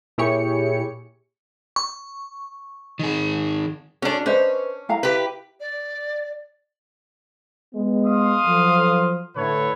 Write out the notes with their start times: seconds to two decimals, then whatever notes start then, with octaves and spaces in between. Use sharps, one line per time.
0.18 A#2 E4 G4 G#4 C#5 C#7
1.76 C#6
2.99 D#3 G#4
4.02 C#4 D4 F#4 D5
4.26 C#4 B4 C5 D#5
4.89 E4 F5 A#5
5.03 G4 B4
5.60 D5
7.74 G#3 B3
8.06 F5 C6 D#6
8.45 F3 F#3 A4
9.36 A2 D3 A4 B4 C#5